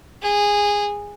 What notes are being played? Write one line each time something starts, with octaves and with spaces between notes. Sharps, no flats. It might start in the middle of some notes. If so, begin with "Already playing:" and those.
G#4